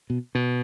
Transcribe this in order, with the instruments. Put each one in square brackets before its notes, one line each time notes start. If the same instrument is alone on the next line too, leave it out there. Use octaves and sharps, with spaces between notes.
[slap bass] B2
B2